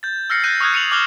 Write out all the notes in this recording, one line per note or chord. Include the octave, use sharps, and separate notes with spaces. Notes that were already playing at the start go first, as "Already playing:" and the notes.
G6 A6
E6 F6 A#6 C7 C#7
F#6 G6 A6 A#6 D#7
C#6 D#6 F6 F#6 G#6
F#6 C#7 D#7 F7 F#7
D6 D#6 F6 F#6 G7